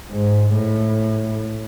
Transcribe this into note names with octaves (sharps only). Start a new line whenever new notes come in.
G#2
A2